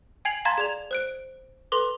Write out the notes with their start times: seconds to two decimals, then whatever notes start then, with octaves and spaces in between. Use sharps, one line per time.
0.25 G5 G#5 G#6 C7 F7 F#7
0.45 F5 A5 A#5 C6 G#6 A6
0.58 G#4 D5 G#6 F7
0.91 C5 F#6 D7
1.72 A4 B4 C6 D6